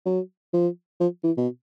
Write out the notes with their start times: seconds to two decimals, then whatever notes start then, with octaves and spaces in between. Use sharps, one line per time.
0.06 F#3
0.53 F3
1.00 F3
1.24 E3
1.37 B2